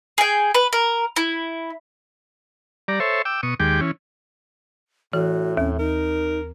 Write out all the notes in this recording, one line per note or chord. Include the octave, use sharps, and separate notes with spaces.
G#4 G5
B4
A#4
E4
G3 D5 A#5
A4 C5 C#5 E5
G5 D6 E6
B2 C#6 D#6
D#2 G#3 G4 G5 D6
E3 C#4
A2 E3 F#4
D#2 C#4
D#4 A#4